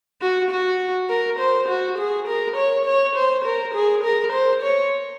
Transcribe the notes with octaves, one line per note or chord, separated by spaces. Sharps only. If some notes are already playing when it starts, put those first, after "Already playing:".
F#4
F#4
A#4
C5
F#4
G#4
A#4
C#5
C#5
C5
A#4
G#4
A#4
C5
C#5